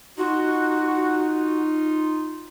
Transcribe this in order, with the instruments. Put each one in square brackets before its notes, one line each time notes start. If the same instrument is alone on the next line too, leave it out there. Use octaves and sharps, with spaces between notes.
[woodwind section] D#4 F4 [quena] F#4